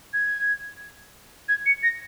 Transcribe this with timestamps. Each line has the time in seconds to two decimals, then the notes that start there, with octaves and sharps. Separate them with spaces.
0.13 G#6
1.49 G#6
1.66 C#7
1.83 A#6